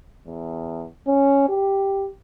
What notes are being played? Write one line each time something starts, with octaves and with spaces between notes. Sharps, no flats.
E2
C#4
G4